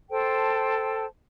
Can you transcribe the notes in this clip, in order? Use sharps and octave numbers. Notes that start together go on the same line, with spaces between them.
A4 C5 G5 A5